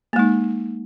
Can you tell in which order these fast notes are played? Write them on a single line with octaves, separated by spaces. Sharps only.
A#3 G#3 D#4